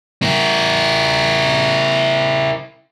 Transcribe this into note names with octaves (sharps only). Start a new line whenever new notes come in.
E4 A#4